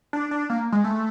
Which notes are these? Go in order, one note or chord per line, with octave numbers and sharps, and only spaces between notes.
D4
D4
A#3
G#3
A3